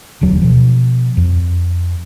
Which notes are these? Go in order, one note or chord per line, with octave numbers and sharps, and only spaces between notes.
E1 D2 F#3
B2 F3
F2